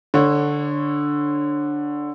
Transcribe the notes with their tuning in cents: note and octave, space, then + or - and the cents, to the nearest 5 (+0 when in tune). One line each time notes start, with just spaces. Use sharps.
D3 +0 C#5 -25